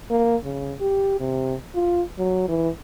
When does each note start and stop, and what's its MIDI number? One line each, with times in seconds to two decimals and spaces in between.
0.11 0.36 58
0.44 0.75 49
0.81 1.19 67
1.20 1.55 48
1.75 2.02 65
2.19 2.45 54
2.48 2.69 52